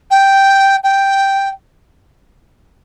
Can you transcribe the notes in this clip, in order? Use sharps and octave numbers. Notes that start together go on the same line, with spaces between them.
G5
G5